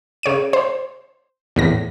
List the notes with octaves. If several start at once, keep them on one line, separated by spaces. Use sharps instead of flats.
C#3 C#5 D7 D#7
C5
E2 A2 A#6